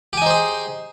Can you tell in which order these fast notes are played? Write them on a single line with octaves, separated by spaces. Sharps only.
G4 G#5 D#4 C5 G#4